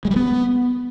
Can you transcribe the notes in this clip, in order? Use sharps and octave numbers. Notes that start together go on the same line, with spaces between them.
G#3
G3
B3